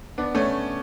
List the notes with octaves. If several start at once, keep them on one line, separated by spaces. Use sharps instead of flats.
B3 D4
A3 C#4